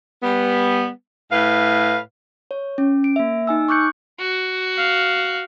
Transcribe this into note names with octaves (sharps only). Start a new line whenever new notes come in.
G3 B3
A2 B4 F5
C#5
C#4
D7
A#3 E5
D#4 G#5 E6
C#6 D6 F#6 G6 C#7
F#4
F5